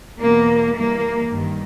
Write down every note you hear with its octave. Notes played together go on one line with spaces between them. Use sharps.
E2 B2 A#3
G2 E3 A#3
G2 D#3